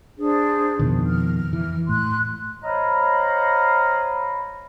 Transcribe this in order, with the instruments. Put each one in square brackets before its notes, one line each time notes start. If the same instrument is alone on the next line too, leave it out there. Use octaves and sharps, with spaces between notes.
[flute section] D4 G#4 C5
[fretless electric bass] F2 B2 D#3
[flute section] F6
[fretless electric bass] E3
[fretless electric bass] A2 [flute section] C6 F#6
[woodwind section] C5 C#5 D#5 F5 A#5 B5